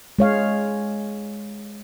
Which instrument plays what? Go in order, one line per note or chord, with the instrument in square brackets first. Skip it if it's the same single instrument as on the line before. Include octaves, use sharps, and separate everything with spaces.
[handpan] G#3 C#5 F5